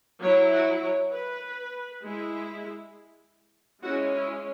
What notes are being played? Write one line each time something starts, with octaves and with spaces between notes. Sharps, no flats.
F#3 E4 C#5
F#4
C#5
B4
G#3 E4
G#3 C#4 E4 F#4
E4